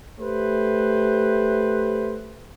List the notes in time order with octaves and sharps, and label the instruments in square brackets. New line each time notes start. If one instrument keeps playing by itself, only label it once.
[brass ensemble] A3 G4 B4 C5